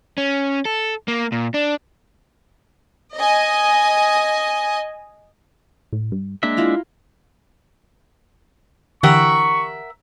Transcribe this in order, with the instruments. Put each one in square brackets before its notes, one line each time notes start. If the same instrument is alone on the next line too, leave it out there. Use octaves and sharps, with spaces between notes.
[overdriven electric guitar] C#4
A4
A#3
A#2
D4
[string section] D#5 G#5
[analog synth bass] A2
G2
[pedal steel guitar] G#3 D4 E5 [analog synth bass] A#3 [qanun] A#5
[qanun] E4 F4 A#5
[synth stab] D3 E3 G4 [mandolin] A#4 E5 F#5 [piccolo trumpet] C#6